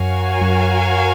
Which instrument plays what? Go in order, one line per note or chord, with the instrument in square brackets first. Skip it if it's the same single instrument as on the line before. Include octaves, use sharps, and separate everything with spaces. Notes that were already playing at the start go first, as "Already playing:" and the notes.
Already playing: [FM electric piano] F#2 [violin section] F#4 A#4 C#5 F5 G#5
[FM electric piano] F#2